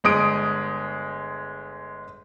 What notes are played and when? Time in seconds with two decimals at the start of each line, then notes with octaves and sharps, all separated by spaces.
0.04 G1 G#3 D#6 D7